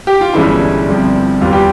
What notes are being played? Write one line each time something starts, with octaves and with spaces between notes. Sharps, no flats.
G4
F4
G1 G2 E3 G#3 C#4 E4
G1 G2 F3 C4
E2 E3 G3 F4
G4